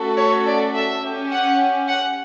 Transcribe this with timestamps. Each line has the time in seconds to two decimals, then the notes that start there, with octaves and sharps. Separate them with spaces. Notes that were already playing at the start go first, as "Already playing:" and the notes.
Already playing: A3 C#4 F#4 A4
0.18 C#5
0.47 D5
0.74 E5
1.03 C#4 G4
1.31 F#5
1.88 F#5